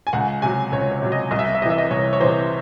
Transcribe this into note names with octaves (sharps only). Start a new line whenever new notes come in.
G#5
C#2 F#5
C3 F#3 G#5
C#2 C#5
C#5
C3 F#3
D#5
C2 D#5
E5
D#5
E5
C3 E3 D#5 E5
D#5
C2 C#5
C#5
C3 E3 C5